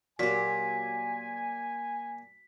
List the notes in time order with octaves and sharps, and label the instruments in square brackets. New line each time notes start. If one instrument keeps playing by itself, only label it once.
[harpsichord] A#2 [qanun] F#3 G4 [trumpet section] G#5 [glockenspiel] B6